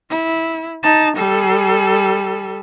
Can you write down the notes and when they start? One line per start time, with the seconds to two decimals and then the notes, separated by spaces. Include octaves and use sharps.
0.10 E4
0.83 D#4 A5
1.17 G3 A4